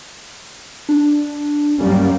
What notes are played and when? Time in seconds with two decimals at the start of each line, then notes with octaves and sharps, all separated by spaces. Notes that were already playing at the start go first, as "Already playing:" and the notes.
0.89 D4
1.78 F#2 G3 A#3 C#4